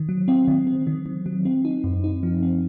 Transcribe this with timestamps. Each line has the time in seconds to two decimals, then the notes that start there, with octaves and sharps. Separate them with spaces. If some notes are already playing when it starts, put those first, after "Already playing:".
Already playing: D#3
0.09 F#3
0.28 C4
0.47 D#3
0.67 C4
0.87 D#3
1.06 D#3
1.26 F#3
1.45 C4
1.65 D#4
1.84 F#2
2.04 D#4
2.23 F3
2.43 C4